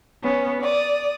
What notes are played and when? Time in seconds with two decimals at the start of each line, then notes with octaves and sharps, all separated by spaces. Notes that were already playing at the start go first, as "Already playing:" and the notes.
0.23 B3 C#4
0.63 D5 D#6